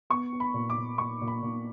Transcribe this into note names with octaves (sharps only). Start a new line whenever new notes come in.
B3 C#6
B3
B5
A#2
D6
A#2
A#2 C#6
A#2
B5
A#2